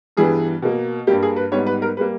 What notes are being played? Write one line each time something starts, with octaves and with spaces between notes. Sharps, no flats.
G2 E3 G3 B3 G#4
B2 A#3
G2 G3 A#3 G4
G#4
B4
G#2 G3 B3 C#5
B4
A#4
G3 A#3 B4